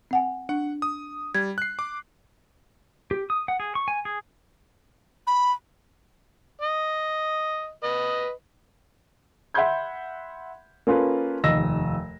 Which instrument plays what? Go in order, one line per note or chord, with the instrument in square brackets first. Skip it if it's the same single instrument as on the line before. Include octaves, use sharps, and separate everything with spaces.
[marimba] C4 F#5 G#5
[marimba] D4 [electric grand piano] F#5
[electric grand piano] D#6
[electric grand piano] G3 [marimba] G#6
[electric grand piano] F#6 C7
D6
[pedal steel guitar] G4
D#6
F#5
G#4
C#6
G#5
G#4
[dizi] B5
[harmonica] D#5
B4 D#5
[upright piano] E5 F#5 B5 C6 G6 G#6
A#3 C#4 F4 A4 B4
F1 D#2 D#5 E6 A#6